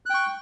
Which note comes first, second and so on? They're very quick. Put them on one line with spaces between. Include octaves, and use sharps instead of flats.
F#6 G5 C#6